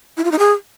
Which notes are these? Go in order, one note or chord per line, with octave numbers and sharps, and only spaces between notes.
E4
F4
D#4
G#4